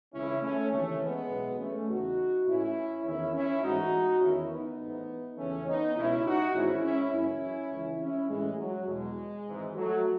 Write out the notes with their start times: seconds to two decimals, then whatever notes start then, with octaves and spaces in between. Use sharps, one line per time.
0.13 C#2 C#3 E3 C#4 E4
0.42 A3 C#4
0.71 D#2 C#3 E3 A3 C#4
1.01 G#3 B3
1.30 B1 A2 E3
1.59 A3 C#4
1.88 E2 C#3 E3 D#4 F#4
2.46 A1 A2 E3 C#4 E4
3.04 E2 D#3 C#4 E4
3.34 C#4 E4
3.63 A1 G#2 E3 D#4 F#4
4.21 E2 D#3 C#4 E4
4.50 B3 D#4
4.79 A1 G#2 E3
5.37 E2 C#3 E3 A3 C#4
5.66 B3 D#4
5.96 C#2 B2 C#4 E4
6.25 D#4 F#4
6.54 G#1 G#2 E3 C#4 E4
6.83 C#4 E4
7.12 F#1 F#2 E3 C#4 E4
7.71 C#2 C#3 E3
7.99 C#4 E4
8.29 A1 A2 E3 G#3
8.58 F#3
8.87 E2 B2 G#3
9.46 G#1 G#2 E3
9.75 F#3 A3